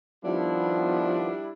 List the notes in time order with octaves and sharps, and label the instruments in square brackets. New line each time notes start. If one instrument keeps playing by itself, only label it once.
[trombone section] D#3 F3 B3 [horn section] G3 D4 E4